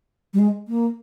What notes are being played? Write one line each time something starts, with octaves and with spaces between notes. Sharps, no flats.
G3
G#3
A#3